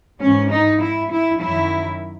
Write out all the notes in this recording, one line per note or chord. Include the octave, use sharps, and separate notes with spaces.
G#2 E3 G#3 C#4
D#4
E4
E4
F#2 D#3 F#3 E4